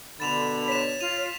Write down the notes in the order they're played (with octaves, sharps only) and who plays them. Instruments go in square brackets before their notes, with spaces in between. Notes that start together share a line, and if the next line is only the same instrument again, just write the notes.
[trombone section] B2 D3 [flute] B5 [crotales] A6 E7 F7
[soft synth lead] C#5 [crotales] B6 E7
[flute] F4 [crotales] D#7 F7